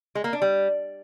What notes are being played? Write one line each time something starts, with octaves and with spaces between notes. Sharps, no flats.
G#3
A#3
D4
G3